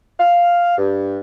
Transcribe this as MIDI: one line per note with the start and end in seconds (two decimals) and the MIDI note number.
0.19 0.74 77
0.77 1.20 43